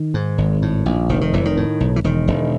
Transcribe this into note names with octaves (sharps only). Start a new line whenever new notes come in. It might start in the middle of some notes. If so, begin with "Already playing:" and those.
Already playing: D#3
G#2
G#1
A2
A#1
F1 D#3
D#3
F1 E3
D#3
A2
B1
E3
E1 D#3
E1